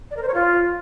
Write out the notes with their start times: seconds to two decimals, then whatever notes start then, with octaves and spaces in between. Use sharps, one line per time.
0.10 D5
0.16 A#4
0.22 C5
0.28 C#5
0.34 F4